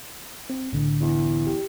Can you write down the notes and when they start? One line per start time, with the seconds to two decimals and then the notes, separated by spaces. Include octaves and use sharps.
0.50 C4
0.72 C2 A2 D3
1.00 E2
1.47 G4